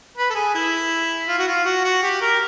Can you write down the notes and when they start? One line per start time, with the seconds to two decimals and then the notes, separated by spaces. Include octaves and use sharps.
0.17 B4
0.30 A4
0.35 G#4
0.54 E4
1.28 F4
1.38 F#4
1.48 F4
1.65 F#4
1.84 F#4
2.03 G4
2.21 A#4